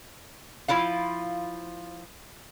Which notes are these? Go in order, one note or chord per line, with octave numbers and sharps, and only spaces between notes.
F3 E4 F4 F5